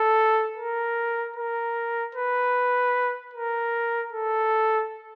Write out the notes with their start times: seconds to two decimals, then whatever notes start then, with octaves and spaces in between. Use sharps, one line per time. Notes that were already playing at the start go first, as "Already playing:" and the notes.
Already playing: A4
0.57 A#4
1.36 A#4
2.15 B4
3.33 A#4
4.13 A4